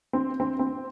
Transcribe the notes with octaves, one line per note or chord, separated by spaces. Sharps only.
C4
C4
C4